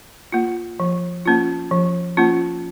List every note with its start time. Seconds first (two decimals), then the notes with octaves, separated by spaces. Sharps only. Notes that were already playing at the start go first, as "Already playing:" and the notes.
0.32 A#3 F4
0.80 F3
1.26 A#3 C#4 F4
1.71 F3
2.17 A#3 C#4 F4